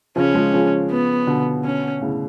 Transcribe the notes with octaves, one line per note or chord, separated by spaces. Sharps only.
C#3 F3 C#4
F3 G#3
C#3 F3
B3
B2 D3
C#4
A2 C#3